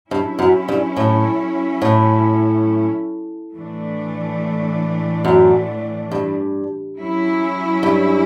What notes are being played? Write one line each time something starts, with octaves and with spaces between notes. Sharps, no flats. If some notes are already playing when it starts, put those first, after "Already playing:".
G2 F#3 C#4 E4
F#2
G2
A2
A2
A2 E3 A3 D4
F#2
G2
F#3 C#4 E4
G2